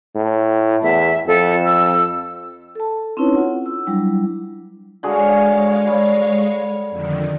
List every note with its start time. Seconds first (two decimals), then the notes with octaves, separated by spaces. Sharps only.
0.16 A2
0.83 E2 E5
1.27 F2 A4
1.66 E6
2.75 A4 A5
3.17 C4 C#4 D#4 E4 B4 C#5
3.36 F4 F#5
3.66 E6
3.86 F#3 G3 D4 E4
5.03 D3 G#3 F#4 G#4 C#5 F5
5.86 G3
6.90 F2 D3 D#3